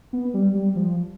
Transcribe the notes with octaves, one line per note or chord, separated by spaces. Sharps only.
B3
G3
G3
F3